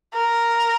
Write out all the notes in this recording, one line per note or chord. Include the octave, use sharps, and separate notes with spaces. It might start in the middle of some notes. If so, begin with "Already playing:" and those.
A#4